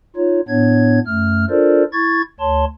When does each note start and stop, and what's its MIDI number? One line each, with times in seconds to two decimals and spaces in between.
0.16 0.40 63
0.16 0.40 65
0.16 0.40 73
0.48 0.99 45
0.48 0.99 59
0.48 0.99 62
0.48 0.99 73
0.48 0.99 92
1.07 1.45 42
1.07 1.45 57
1.07 1.45 89
1.50 1.84 62
1.50 1.84 65
1.50 1.84 69
1.50 1.84 70
1.50 1.84 72
1.50 1.84 74
1.93 2.22 64
1.93 2.22 85
1.93 2.22 92
1.93 2.22 93
2.40 2.65 38
2.40 2.65 73
2.40 2.65 81
2.40 2.65 84